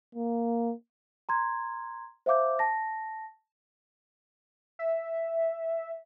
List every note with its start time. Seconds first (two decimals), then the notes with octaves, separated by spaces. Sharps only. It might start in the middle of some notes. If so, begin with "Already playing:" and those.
0.15 A#3
1.29 A#5 C6 G#6
2.26 C5 E5 F5 D6 G6
2.59 A5 A#6
4.79 E5